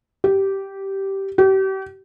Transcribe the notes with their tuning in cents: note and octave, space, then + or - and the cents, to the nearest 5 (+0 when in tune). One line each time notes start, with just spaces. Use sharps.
G4 -10
G4 -35